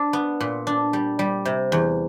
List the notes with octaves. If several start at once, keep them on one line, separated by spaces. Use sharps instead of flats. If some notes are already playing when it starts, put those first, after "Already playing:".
Already playing: D4
B3
A#2
D4
G3
G3
C3
E2